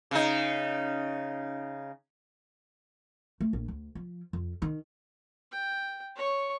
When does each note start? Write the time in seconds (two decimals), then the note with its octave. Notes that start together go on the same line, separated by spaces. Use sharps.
0.11 C#3 D#4
3.41 A3
3.53 A#1
3.68 D2
3.95 F3
4.33 F2
4.62 D#3
5.52 G5
6.16 C#5 C#6